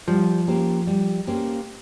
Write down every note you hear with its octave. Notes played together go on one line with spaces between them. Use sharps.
F3 G3
A#3 C#4 G4 C5
G3
A#3 C#4 G4 C5